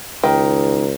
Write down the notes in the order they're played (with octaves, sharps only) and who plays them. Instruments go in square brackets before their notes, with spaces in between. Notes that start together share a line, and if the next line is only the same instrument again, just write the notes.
[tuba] C#2 [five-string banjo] D#3